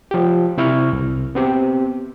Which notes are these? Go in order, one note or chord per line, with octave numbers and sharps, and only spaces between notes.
F3 G4
C3 E4 C#6 F6
C2
B3 C4 G4